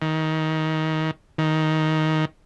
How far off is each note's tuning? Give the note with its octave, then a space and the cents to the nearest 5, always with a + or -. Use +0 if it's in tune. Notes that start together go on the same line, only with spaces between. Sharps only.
D#3 +20
D#3 +10